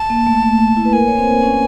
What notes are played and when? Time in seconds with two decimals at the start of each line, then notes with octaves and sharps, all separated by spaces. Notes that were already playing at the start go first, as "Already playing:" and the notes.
Already playing: A5
0.10 A#3
0.27 A3
0.43 A3
0.53 A3
0.59 A#3
0.77 E4
0.85 B4
0.93 A#3 A#4 G#5
1.07 C#5
1.18 C4 C5
1.43 C#4 C#5